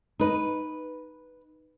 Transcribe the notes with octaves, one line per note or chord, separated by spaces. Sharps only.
D#4 B4